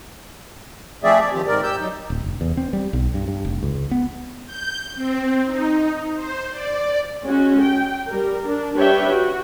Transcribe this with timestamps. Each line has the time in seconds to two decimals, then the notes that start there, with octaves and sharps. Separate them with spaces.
1.03 F3 A3 C4 G#4 D5 E5
1.20 D5
1.33 D#3 F3 C4 G4
1.47 G#2 D#3 A#4 D5
1.63 G4 E6 G6
1.79 F#3 D#4
2.10 D1
2.24 F1
2.41 E2
2.57 C4
2.73 G3
2.93 B1
3.14 G2
3.28 G2
3.45 F1
3.63 C#2
3.91 B3
4.46 G6
4.95 C4
5.46 D#4
6.15 C5
6.50 D5
7.23 G#3 C#4 F#4
7.61 G5
8.08 G3 A#4
8.46 D4
8.75 G3 D4 B4 C#5 E5 G5
9.09 F#4